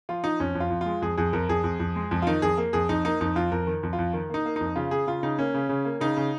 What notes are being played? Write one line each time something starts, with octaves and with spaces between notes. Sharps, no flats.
F3 F4
F3 D#4
F2 C#4
F2
F4
F2
G#3 F4
F2 G#4
F2 G#4
F2 A#4
F2 G#4
F2
F2
G#3
F2
F4
D#3 D#4
F2 G#4
A#3
F2 G#4
F2 D#4
A#3 D#4
F2 D#4
F2 F4
F2 A#4
D#3
F2
F4
F2
D#3
A#3 D#4
A#3
F2 D#4
C#3 F4
C#3 G#4
C#3 F4
C#3 D#4
A#3 C#4
C#3
C#3
A#3
C#3 D#4
C#3